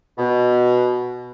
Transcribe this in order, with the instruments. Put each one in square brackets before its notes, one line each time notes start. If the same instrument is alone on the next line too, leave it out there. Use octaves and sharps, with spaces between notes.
[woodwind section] B2